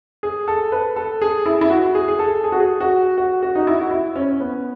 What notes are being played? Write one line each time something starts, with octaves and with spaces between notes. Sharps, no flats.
G#4
A4
B4
A4
G#4
E4
E4
F#4
G#4
G#4
A4
G#4
F#4
G#4
F#4
F#4
F#4
D#4
E4
F#4
E4
C#4
C#4
B3